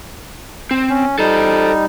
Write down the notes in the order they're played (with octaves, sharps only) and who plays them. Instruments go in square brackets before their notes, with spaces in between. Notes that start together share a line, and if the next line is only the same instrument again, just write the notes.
[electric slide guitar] C4
[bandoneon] C#4
[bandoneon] G3 D#4 [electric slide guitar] A4 C5